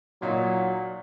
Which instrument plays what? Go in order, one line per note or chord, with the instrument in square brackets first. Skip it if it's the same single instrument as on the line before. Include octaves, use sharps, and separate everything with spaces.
[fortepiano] A#2 D#4 [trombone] F#3